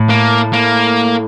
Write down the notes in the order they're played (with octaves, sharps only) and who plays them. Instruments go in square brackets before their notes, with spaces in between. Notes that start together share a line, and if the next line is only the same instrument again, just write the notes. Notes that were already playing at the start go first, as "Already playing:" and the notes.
Already playing: [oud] A2
[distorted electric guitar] A#3
A#3